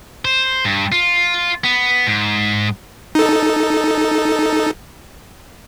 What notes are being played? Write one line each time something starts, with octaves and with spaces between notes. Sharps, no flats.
C5
G2
F4
B3
G#2
D#4 A4